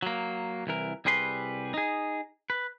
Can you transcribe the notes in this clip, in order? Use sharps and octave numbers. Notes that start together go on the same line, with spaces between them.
F#3 A#3
C2 E3 A#4
C2 G3 G#4 B4 C6
D#4 G#4
B4